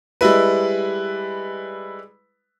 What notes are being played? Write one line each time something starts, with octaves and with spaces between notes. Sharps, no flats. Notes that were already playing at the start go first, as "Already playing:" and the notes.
G3 G#3 E4 B4